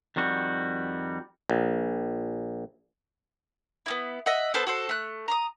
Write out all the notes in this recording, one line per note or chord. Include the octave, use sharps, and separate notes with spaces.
F2 D#3 G3 F#4
A#1
B3 D#4 E4
D#5 E5 F#5
B3 A4 C5 A5
F#4 A4 C5
A3 F#6
A#5 C6 D#6